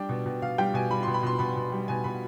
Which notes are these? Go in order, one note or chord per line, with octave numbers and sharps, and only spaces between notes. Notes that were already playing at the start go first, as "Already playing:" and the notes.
Already playing: G3 D4 G5
B2
B2
B2 F5
G3 G5
B2 G#5
G3 B5
B2 C6
B5
B2 C6
B2 B5
B2
G3
B2 G#5
B2 B5